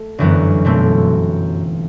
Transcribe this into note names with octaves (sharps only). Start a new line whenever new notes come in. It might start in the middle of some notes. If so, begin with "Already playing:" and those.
Already playing: A3
G1 F#2 E3 B3
B1 B2 A3 C4